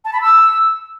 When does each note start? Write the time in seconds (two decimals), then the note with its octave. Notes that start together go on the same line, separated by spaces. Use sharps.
0.05 A5
0.13 B5
0.21 E6